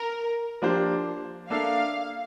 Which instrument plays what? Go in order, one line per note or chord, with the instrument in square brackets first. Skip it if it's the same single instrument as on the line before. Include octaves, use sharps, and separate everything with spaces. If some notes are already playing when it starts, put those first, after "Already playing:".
Already playing: [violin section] A#4
[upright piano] F3 A#3 D4 G4 C5
[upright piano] A#3 D4 A4 E5 [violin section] F5